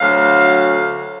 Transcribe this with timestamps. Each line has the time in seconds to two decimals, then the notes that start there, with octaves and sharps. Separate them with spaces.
0.01 D2 F#3 F5